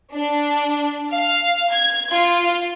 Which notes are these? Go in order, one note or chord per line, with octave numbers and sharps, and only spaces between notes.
D4
F5
G#6
F4